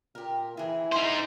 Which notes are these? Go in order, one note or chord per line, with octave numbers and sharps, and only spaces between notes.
A#2 G4 A#4
E3 E4 G#4
F3 D#4 A#4 C5 G#5